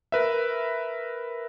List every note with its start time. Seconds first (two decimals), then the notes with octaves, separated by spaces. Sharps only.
0.12 A#4 B4 E5